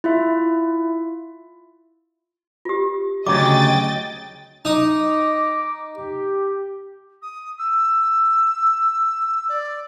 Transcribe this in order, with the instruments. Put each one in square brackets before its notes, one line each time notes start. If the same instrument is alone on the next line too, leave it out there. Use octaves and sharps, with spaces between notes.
[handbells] E4 F4 E5
[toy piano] F4 G4
[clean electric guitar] D2 C#3 F#3 [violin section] D#5 G5 A6 [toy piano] D6
[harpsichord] D#4 D#6 [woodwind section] A#5 D6
[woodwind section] G4
[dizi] D#6
E6
D5